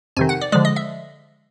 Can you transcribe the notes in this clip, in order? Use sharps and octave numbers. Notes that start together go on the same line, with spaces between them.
F2 C3 D#3 G#5
F#5
D5
D3 F3 G#3 D5
D#5
E5